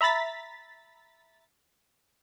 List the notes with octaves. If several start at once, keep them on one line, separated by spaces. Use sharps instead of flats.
E5 A#5 B5 A6 B6